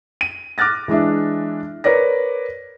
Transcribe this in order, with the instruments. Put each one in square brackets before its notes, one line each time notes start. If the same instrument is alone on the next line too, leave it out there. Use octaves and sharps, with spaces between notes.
[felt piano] D#7
D6 F6 F#6 A6 A#6
E3 G#3 D4 E5
A#4 B4 C#5 D5 A#6